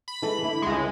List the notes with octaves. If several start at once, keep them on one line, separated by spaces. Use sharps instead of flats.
B5
E3 G#3 A4
D3 E4
C#2 G#3